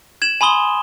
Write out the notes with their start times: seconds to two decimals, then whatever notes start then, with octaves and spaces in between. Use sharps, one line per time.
0.22 G#6 E7 F#7
0.41 G#5 B5 C6 D#6 G7